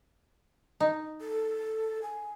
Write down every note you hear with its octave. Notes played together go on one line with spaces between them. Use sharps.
D#4
A4
G#5